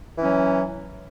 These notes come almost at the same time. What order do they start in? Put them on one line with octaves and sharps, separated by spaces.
E3 C#4 F#3